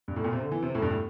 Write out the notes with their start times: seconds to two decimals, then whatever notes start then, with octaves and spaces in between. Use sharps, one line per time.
0.08 G2
0.16 A2
0.24 A#2
0.33 C3
0.42 D3
0.52 E3
0.63 C3
0.75 A2
0.82 G2
0.91 A2